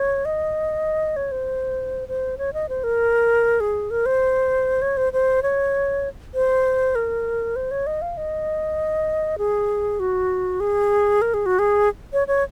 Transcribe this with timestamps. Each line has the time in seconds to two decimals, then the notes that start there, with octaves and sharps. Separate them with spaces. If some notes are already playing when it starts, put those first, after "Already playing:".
Already playing: C#5
0.25 D#5
1.16 C#5
1.32 C5
2.08 C5
2.38 C#5
2.54 D#5
2.69 C5
2.84 A#4
3.60 G#4
3.91 A#4
4.06 C5
4.82 C#5
4.97 C5
5.13 C5
5.43 C#5
6.34 C5
6.95 A#4
7.56 C5
7.71 C#5
7.87 D#5
8.02 F5
8.17 D#5
9.38 G#4
10.00 F#4
10.60 G#4
11.22 A#4
11.34 G#4
11.46 F#4
11.59 G#4
12.13 C#5
12.28 C#5